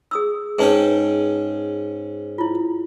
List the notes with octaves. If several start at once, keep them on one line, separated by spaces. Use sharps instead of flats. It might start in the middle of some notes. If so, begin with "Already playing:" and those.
G#4 D#6 E6
G#2 C#4 G#4 B4 G5 A5
E4 F4